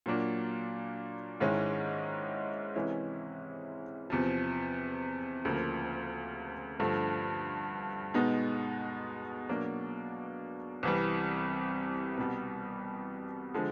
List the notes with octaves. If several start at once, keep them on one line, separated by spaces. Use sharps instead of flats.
A#2 F#3 A#3 D4
G#2 D#3 G#3 C#4 E4
C3 E3 G#3 C#4 E4
E2 C3 F3
D2 C#3 F3 A#3
G2 D3 F3 A3
B2 G#3 B3 D#4
B2 F#3 A#3 D4
C2 C3 E3 G3
C2 B2 G3 B3
D3 F3 G#3